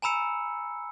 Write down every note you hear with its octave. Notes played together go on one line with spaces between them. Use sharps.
G#5 A#5 B5 E6 C#7